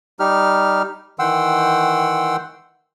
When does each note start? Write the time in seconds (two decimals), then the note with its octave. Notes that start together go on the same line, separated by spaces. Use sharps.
0.20 G3 D#4 G4 F6
1.19 D#3 E3 F#5 G5 C6 E6